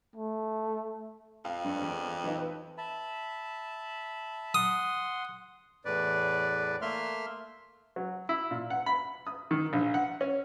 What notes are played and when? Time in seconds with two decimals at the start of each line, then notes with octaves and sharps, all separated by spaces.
0.16 A3
1.45 F2 F5
1.64 G2
1.81 E2
2.24 E3 D#4
2.38 B4
2.78 E5 A5 B5
4.54 F#5 C6 D#6
5.85 E2 A2 B4 D5
6.82 A3 A#3 E5 C6 F6
7.96 F#3
8.29 E4
8.51 A#2
8.70 F#5
8.86 B5
9.27 D#6
9.51 D#3
9.73 A#1
9.94 F#5
10.21 C#4